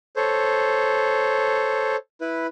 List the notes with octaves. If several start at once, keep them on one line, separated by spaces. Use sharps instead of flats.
A4 C5 C#5
E4 B4